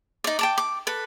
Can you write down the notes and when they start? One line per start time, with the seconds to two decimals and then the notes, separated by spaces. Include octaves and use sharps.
0.24 D#4 D5
0.39 G5 A5 D6
0.58 D6
0.87 A4 B4